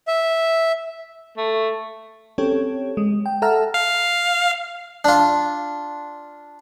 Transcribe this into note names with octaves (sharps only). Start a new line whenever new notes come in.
E5
A3
C4 C#4 G4 A4 C#5
G#3
G5
A4 E5 F#5 A5 A#5 F6
F5
D4 F4